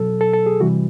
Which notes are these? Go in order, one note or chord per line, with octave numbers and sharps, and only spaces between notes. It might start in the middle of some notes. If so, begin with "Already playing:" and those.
Already playing: B2 F#3 A4
A4
A4
G#4
C3 E3 G3 F#4